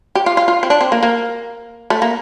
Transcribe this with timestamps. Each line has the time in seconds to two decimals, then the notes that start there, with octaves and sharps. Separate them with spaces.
0.15 G4
0.26 F4
0.37 F4
0.48 F4
0.63 C4
0.70 D4
0.81 C4
0.92 A#3
1.03 A#3
1.90 A3
2.02 A#3